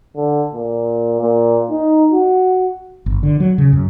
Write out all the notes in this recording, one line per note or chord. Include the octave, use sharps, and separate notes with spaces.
D3
A#2
A#2
D#4
F#4
G1
D3
F#3
C#3
F#2